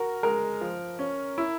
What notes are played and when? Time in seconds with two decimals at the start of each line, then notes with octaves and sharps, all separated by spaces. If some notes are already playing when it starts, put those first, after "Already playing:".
Already playing: F#4 A#4
0.23 G#3 A#4
0.61 F3
0.99 C#4
1.38 E4